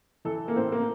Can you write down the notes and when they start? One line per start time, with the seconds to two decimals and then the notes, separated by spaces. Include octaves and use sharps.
0.25 E3 A4
0.48 A#3
0.56 A2 C4
0.72 A#3